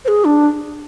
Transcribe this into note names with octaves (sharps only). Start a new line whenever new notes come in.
C5
G#4
D4